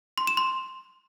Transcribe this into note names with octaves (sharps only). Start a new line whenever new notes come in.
C6
E7
C6